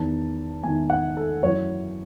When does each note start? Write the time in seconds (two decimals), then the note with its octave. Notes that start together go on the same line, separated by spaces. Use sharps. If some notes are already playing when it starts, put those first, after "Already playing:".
Already playing: E2 D#3 A5
0.63 E2 G#5
0.68 D#3
0.90 F#5
1.17 A4
1.43 F#2 E3 C#5